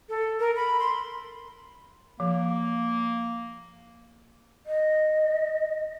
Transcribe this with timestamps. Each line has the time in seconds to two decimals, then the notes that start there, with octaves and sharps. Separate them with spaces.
0.09 A4
0.40 A#4
0.56 B5
0.80 C6
2.20 F3 A#3
4.66 D#5